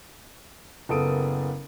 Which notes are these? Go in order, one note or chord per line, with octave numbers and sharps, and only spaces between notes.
F#1 B3 A4 A#4 D#6 D7